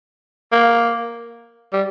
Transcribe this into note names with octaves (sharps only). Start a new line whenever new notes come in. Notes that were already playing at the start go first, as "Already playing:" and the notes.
A#3
G3